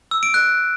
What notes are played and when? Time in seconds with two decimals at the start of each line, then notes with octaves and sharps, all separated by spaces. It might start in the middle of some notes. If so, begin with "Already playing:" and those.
0.11 E6
0.23 D7
0.34 F#6